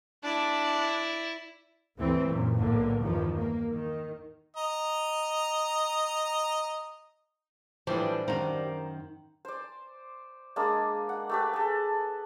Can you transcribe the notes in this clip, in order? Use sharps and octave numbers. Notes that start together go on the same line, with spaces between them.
D4 E4 D5
D2 G2 E3 A3 C4
F#2 A#2
B1 A2 D3 A#3
E2 G2 D#3 F3
A#3
D#3
D#5 A#5
A2 E3 F3 G3 D4 C5
F#2 D#3 C5 F5 A#5
C5 D5
G#3 A#3 D4
F#5
A3 G4 B4
G#4 A4